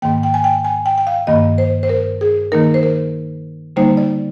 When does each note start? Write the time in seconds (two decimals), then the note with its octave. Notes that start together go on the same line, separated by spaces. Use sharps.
0.02 G#2 D#3 A#3 G5
0.23 G5
0.34 G#5
0.44 G5
0.65 G#5
0.86 G5
0.98 G5
1.07 F5
1.27 G2 D#3 A#3 D#5
1.58 C5
1.83 C5
1.89 A#4
2.21 G#4
2.52 D#3 A#3 D#4 A#4
2.74 C5
2.83 A#4
3.76 D3 G3 A#3 D#4 C5
3.97 D5